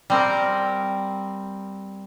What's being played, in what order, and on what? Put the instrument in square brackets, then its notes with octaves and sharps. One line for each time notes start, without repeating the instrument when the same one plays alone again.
[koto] G3 C4 A#4